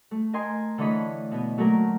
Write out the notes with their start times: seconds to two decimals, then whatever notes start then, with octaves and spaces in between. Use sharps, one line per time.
0.11 A3
0.33 A#4 D#5 G#5 C6
0.78 D3 E3 A3 C#5 D#5 B5
1.31 B2 B3
1.58 F#3 A3 A#3 A#4